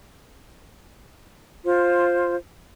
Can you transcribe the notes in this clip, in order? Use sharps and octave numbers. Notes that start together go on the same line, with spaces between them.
F4 C5